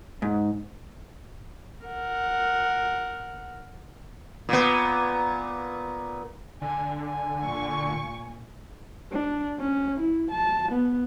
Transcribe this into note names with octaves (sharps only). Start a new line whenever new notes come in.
G#2
A#4 F#5
A#2 B3
D3 G#5
G#5
A#2 C#6
D4
C#4
E4
A5
B3